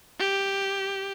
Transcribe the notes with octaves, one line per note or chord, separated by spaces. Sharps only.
G4